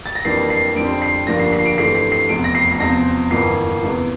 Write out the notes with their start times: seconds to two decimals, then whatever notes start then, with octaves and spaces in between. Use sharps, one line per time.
0.06 A6
0.15 A#6
0.25 F2 E3 G3 A#3 D4 C7
0.50 C7
0.76 F2 D3 G3 C4 D7
1.02 C7
1.27 G1 G2 F3 A#3 D4 A#6
1.40 C7
1.53 C7
1.66 D7
1.78 G2 E3 A3 C4 C7
1.95 C7
2.12 C7
2.29 F1 E2 C3 D7
2.44 A#6
2.55 C7
2.71 C7
2.80 E2 C3 F3 C4 A#6
3.31 G1 F2 E3 A#3 C7
3.82 E2 C3 E3